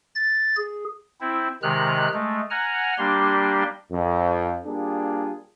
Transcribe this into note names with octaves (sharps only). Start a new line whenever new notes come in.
A6
G#4
C4 E4
C3 D#3 G#3 F6 F#6
G#3 A3
F#5 G#5 A#5 F6
G3 A#3 D4 G4 C6
F2
G3 A#3 D4 F4 G#4